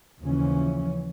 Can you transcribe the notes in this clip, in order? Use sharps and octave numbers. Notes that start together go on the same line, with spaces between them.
D#2 C#3 E3 F3 C#4